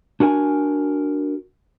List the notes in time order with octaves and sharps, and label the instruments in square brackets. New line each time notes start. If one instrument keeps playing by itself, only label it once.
[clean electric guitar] D4 F#4 A#4 G#5